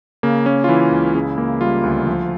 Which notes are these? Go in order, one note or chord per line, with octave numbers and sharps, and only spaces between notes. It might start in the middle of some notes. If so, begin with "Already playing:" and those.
C#3 A#3
A#3 C#4
F4
E3 E4
C#2
C#3
A#3
G3 F4
D2
F3